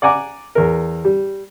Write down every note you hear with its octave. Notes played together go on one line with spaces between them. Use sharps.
D5 F#5 G#5 A#5 D6
E2 A#4
G3